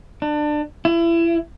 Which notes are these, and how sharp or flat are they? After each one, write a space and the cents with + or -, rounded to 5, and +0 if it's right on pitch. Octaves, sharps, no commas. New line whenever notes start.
D4 +25
E4 +30